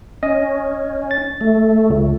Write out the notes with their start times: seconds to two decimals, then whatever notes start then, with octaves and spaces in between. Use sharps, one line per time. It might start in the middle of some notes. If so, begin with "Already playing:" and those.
0.23 C#4 D#5
1.11 A6
1.41 A3
1.90 C#2